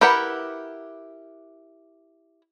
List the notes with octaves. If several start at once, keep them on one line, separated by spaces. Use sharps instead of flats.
E4 G4 A#4 B4 F#5